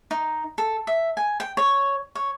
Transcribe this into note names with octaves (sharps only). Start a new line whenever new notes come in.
D#4
A4
E5
G#5
G5
C#5
C#5